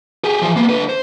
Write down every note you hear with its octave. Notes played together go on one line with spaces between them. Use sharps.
G4 G#4
E3 F3
A#3 B3
D3 B4
C5